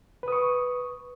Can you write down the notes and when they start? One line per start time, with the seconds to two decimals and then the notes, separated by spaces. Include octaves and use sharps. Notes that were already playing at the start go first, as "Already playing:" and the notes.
0.23 B4
0.28 D#6
0.32 C#6